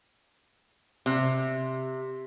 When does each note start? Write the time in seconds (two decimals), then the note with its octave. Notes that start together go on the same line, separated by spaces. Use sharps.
1.06 C3